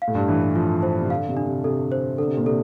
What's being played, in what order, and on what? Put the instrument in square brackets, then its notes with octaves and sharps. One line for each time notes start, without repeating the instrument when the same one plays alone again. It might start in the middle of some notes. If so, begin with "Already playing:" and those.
[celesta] F5
[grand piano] A2
G2
[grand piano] E3 [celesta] D4
[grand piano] E3
[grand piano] F3 [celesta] F4
[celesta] C5
[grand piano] C3
[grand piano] D3 [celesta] F5
[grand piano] C3
[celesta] D4
[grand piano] C3
[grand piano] C3 [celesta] A4
[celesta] C5
[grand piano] D3 [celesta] A4
[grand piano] C3
A#2
[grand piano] C3 [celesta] A4